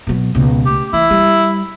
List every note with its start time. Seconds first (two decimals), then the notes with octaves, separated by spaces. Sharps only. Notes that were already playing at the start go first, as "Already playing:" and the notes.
0.07 B2 F#3
0.35 C#2 B2
0.66 A3 G4
0.93 E3 E4
1.10 G3